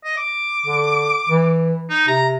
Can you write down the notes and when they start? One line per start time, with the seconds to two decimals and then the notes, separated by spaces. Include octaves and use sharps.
0.04 D#5
0.17 D6
0.66 D3
1.30 E3
1.90 D#4
2.08 C3 A#5